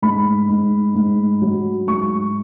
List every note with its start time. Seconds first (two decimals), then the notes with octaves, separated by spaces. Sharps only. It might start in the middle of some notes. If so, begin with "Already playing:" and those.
0.02 G#2 B5
0.49 G#2
0.95 G#2
1.42 F#3
1.87 G#2 C#6